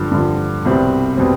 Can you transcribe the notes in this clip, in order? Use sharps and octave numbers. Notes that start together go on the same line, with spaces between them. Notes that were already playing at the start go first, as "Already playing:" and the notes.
Already playing: G2 D3 F3
G2 D3 F3
C2 B2 G3 C4
B2 G3 C4